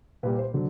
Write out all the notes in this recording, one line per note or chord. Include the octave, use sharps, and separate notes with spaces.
A#2 G3 A#3 B4
C5
D3 F#3